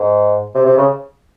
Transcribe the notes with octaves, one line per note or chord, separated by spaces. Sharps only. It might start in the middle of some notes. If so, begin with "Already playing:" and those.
Already playing: G#2
C3
C3
C#3